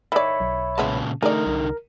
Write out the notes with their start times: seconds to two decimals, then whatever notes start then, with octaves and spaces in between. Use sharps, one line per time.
0.12 D#3 C#5 D5 E5 B5
0.40 B1
0.78 A#2 C#3 G#3 B3 E4 A5
1.22 D3 A3 D#4 G#4 A#4 D5
1.46 C2